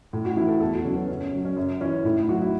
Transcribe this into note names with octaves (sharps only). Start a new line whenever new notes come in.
A2
F#4
E3 E4
A4
E2 A4
F#4
C#3 F#3 C#4
B3
F#2 C#4
C#4
C#3 F#3
C#4
F#2
E3 C#4
A2 E4
E4
F#3 F#4
E4